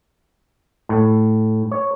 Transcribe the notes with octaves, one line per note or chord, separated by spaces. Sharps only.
A2
C#5